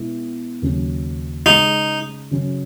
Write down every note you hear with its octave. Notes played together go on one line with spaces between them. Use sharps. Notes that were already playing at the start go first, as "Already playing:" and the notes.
Already playing: B2 G#3 B3 E4
D#2 C#3 F#3 C#4
C#3 G#3 C#4 D#4
C#3 F#3 C#4